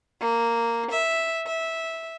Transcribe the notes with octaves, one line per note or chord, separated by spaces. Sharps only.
A#3
E5
E5